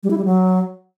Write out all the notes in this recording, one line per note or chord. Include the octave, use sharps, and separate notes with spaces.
G3
E4
G3
F#3